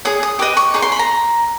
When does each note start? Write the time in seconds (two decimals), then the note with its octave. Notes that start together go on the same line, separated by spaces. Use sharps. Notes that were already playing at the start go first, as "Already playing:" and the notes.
0.05 G#4 C#5 D#6
0.23 D#6
0.39 G4 B4 D#5 D6
0.57 C#6
0.74 D#4 G#4 C#5 C#6
0.82 C6
0.92 B5
0.99 A#5